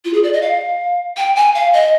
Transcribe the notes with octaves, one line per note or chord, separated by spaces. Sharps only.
F4
G#4
D5
D#5
F5
G5
G#5
F5
D#5